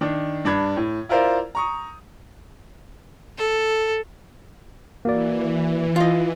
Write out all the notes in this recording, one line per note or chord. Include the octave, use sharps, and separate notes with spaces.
D#3 D4
G2 D4 B5 G#6
A2
E4 F4 A#4 C5 D5 F5
A#5 C#6 D#6
A4
E3 A#3 F#4 D5
F4 D#5